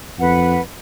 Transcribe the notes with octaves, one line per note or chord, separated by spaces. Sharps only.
F2 B4 F#5